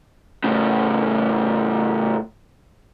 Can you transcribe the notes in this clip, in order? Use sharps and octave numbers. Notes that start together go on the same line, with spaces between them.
A2 C#3